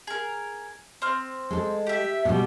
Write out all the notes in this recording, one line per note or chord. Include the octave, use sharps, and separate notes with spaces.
G#4 A#4
C4 F6
G#3 A4
G4 E5
B2 G3